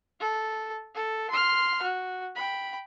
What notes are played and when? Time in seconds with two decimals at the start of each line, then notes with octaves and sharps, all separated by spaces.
0.20 A4
0.95 A4
1.30 C6 F6
1.82 F#4
2.36 G5 B5